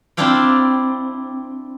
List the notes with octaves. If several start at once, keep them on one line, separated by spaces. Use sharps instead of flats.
C4 D4 E4 D5 F5 G5